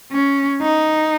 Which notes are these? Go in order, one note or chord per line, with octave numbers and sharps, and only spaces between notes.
C#4
D#4